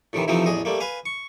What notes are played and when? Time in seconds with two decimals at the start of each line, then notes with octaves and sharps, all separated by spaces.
0.13 A2 C3 D#3 E3
0.28 C3 E3 F3 A3 C4 D#4
0.46 A1 E2 G#4 D#5
0.65 G3 A3 A#3
0.80 B4 F5 G#5
1.06 C#6